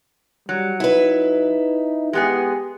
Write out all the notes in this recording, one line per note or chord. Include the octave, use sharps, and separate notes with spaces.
F#3 G3
D#4 E4 B4
G#3 B3 G4 G#4